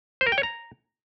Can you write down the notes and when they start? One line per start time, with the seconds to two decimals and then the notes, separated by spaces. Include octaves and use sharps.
0.21 C5
0.27 A#4
0.32 G5
0.38 C#5
0.43 A#5